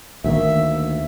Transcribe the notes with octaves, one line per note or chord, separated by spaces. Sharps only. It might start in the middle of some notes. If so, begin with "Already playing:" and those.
D2 D#3 A#3 E5